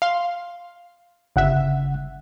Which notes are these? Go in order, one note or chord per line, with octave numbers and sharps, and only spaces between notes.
F5 C6
G1 C#3 E5 F#5 F#6